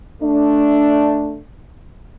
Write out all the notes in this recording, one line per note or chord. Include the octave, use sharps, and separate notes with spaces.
A3 D4